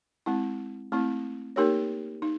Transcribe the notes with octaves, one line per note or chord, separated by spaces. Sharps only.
G#3 C4 E4
A3 C4 E4
A#3 D#4 G4 A#4 C#5
D#4